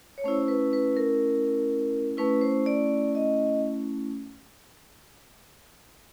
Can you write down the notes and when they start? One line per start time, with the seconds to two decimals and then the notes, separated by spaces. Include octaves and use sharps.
0.18 C#5
0.24 A3 C#4 E4 C5
0.48 B4
0.73 B4
0.97 A#4
2.17 A3 C#4 E4 B4
2.41 C5
2.66 D5
3.15 D#5